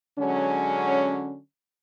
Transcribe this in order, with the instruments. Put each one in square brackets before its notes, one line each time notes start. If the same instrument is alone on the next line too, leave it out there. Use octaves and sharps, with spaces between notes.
[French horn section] D3 F#3 G#3 C#4